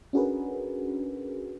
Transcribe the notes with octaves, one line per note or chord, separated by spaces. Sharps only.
C#4 D4 F#4 G#4 A#4 B4